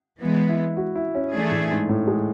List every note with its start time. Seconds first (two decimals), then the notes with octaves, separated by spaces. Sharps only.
0.20 E3 G#3 B3
0.49 E4
0.77 F#4
0.95 E4
1.15 C#4
1.34 E3 A3 D4 G#4
1.51 A2
1.71 G#2
1.89 A2
2.07 G#3